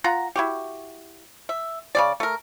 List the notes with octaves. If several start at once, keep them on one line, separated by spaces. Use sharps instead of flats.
F4 F#5 A#5
E4 F#4 G4
E5
C#3 G#3 D5
A3 A#4